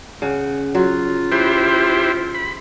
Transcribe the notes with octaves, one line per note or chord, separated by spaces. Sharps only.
C#3 F#5
F#3 F4
E4 G4 B4 C5
B5